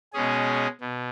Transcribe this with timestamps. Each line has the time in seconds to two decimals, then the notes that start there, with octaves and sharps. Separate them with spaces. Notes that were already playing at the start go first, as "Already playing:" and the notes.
0.13 B2 G#3 C#4 G#4
0.81 B2